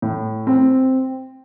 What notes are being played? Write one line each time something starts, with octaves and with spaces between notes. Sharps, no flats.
A2
C4